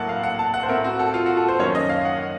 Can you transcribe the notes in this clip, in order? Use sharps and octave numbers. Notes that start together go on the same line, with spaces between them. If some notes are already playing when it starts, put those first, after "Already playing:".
Already playing: A2 F#3 A#3 F#5 A5
F5
F#5
A5
F#5
C5
A2 A3 C4 A#4
F#4
A4
F4
F#4
A4
C5
F#2 D#3 A#3 C#4 C#5
D#5
F5
F#5